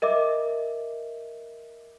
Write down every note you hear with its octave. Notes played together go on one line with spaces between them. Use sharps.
A#4 D#5 E5 D6